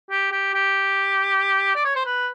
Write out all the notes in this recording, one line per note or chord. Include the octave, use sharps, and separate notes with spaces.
G4
G4
G4
D5
C#5
C5
B4